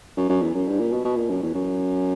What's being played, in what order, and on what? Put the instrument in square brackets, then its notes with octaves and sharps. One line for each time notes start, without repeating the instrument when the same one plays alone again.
[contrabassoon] F#2
F#2
E2
F#2
G2
A#2
B2
B2
A#2
F#2
E2
F#2